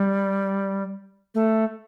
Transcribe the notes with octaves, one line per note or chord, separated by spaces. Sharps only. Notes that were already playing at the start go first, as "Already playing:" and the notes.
Already playing: G3
A3